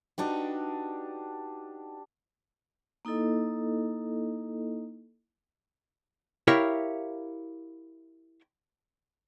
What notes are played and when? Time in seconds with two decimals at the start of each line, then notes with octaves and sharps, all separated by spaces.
0.18 D4 D#4 F#4 G4 B4
3.05 A#3 D#4 E4 A4 D#5
6.48 E4 G4 A#4 C#5 E5 F5